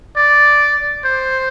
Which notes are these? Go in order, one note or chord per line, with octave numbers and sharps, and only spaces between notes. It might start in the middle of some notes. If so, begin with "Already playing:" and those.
D5
C5